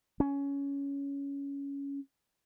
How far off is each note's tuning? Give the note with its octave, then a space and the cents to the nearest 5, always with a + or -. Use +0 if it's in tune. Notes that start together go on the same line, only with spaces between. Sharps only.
C#4 +15